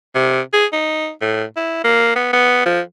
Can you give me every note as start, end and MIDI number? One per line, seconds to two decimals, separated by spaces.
0.15 0.41 48
0.53 0.66 68
0.73 1.11 63
1.21 1.44 45
1.56 1.84 64
1.84 2.13 58
2.16 2.33 59
2.33 2.65 59
2.66 2.80 53